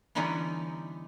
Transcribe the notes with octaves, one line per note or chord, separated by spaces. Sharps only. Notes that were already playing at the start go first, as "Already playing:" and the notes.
D3 E3 G3 B3 C#4 D#4